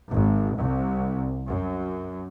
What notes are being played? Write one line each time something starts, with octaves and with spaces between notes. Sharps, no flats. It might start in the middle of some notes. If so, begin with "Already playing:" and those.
G#1
C2
F#2